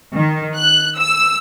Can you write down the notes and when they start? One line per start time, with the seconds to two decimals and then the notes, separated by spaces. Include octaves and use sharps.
0.15 D#3
0.57 F#6
0.98 E6